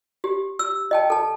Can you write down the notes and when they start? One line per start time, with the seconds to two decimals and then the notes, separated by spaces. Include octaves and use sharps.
0.24 G4
0.59 E6
0.91 D#5 G5 A5
1.10 A4 A5